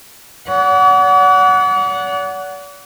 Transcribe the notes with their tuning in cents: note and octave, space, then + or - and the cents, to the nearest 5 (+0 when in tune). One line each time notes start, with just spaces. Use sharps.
D5 -45 F#5 +0